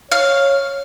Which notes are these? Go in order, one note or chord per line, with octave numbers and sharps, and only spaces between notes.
C#5 F5